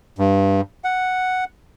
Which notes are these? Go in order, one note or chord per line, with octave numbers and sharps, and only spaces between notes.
G2
F#5